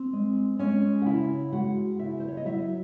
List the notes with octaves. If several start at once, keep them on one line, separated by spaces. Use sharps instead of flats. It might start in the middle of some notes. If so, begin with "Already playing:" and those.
Already playing: C4
G#3
G#3 C#4 C#5
F#5
C#3 E4 E5
G#3 F#4 F#5
C#3 E4 E5
C5
C#5
D#5
F#3 E4 E5